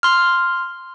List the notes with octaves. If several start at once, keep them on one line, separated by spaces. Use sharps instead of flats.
C6 F6